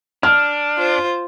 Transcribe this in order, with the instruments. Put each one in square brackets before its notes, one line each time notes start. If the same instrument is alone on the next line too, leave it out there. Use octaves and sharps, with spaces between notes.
[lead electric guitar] D4 [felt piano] F6
[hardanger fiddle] F4 C5